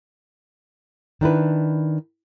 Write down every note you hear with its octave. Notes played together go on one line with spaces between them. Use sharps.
D#3 D4 E4 B4